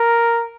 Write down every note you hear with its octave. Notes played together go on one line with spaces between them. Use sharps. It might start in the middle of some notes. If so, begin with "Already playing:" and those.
Already playing: A#4